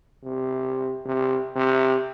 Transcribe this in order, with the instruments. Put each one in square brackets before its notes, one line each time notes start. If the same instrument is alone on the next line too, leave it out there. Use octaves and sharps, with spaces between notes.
[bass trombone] C3
C3
C3